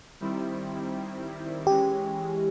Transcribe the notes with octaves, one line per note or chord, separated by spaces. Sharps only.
D#3 G3 C4 E4
E3 G#3 C#4 G4